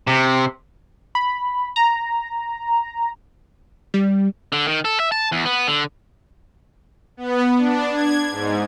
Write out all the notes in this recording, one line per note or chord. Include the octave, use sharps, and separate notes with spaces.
C3
B5
A#5
G3
D3
D#3
A4
E5
A5
E2
B3
D3
B3
D4
G#6
G#2